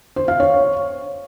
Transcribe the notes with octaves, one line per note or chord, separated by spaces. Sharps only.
C5
F5
C#5